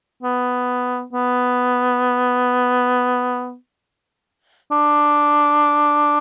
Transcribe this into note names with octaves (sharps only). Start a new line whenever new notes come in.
B3
B3
D4